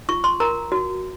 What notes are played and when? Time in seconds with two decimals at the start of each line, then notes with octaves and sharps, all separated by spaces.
0.09 F4 C#6
0.24 C6
0.40 A#4 A#5
0.72 F#4